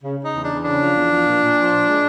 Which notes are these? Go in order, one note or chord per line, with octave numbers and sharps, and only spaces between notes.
C#3
C#3
D#4
E2
D4
E2
C#3 D4
F3
E2
F3
A#2
A#2
F3
A#2
G#3